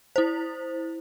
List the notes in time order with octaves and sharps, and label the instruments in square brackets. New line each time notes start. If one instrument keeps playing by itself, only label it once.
[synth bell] E4 C5